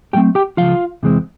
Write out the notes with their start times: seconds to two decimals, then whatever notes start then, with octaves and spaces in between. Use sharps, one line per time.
0.13 A2 F#3 A3 C4 G4 G5
0.35 G4 G5
0.57 C#2 C3 F3 F4 F5
1.03 E2 C3 E3 G#3 C4